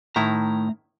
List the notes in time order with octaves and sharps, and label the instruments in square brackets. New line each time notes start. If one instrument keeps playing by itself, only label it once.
[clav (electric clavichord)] A2 D#3 E4 [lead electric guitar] A3 A#5